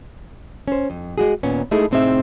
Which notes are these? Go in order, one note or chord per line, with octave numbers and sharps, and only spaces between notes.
C#4 C5
F2
G#3 F#4 G#4
D#2 A#2 B3 C#4
G#3 A3 D#4 E4 G#4 A4
A2 C3 C4 D#4 G#4 E5